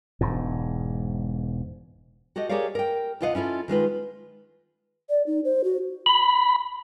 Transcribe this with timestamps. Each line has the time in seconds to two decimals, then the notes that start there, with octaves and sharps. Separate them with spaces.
0.21 E1 G#2
2.36 F#4 G4 A4 D#5
2.49 G4 G#4 A#4 C#5 D5 F5
2.75 A#4 G5
3.21 D2 C3 F4 D#5 F5 F#5
3.35 C#4 E4 F4 A4
3.68 D#3 G#3 F4 B4
5.09 D5
5.27 D#4
5.44 C5
5.64 F#4
6.06 B5